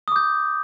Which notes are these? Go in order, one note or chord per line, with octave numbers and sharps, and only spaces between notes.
D6 D#6 G6